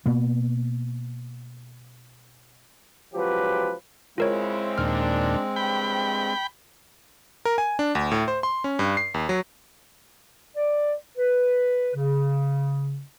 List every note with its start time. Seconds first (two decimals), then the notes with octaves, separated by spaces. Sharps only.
0.06 B2 A#3 B3
3.14 C#2 F3 F#3 G4 B4
4.18 C#3 G#3 C4 E4 F4 A#4 C#5
4.78 D#2 A#2 D4 F6
5.56 G2 C#3 F3 G5 B5
7.45 A#4
7.58 G#5
7.79 D4
7.95 D2
8.12 A2
8.28 C5
8.43 C6
8.64 C#4
8.79 G2
8.97 C7
9.14 D#2
9.29 F#3
10.56 D5
11.17 B4
11.95 C#3